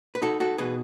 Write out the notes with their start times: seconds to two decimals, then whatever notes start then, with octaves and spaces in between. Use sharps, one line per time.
0.15 B4
0.22 D#4 F#4 A4
0.40 F#4 A4
0.58 B2 G#4 B4